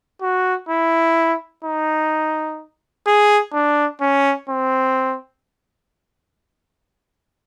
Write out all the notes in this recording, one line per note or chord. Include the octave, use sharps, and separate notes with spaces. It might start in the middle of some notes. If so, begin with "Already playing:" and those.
F#4
E4
D#4
G#4
D4
C#4
C4